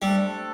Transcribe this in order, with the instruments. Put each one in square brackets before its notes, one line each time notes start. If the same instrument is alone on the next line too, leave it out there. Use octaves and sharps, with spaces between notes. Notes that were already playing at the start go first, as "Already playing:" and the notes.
[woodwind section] C3 A3 D4 A4 [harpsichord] G3